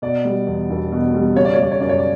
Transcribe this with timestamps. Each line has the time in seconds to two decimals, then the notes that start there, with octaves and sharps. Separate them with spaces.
0.02 B2 D5
0.25 G3
0.47 E2
0.70 E1
0.92 B2
1.14 G3
1.36 C#3 C#5
1.45 D5
1.54 C#5
1.58 G3 D5
1.72 C#5
1.80 F#2 D5
1.89 C#5
1.98 D5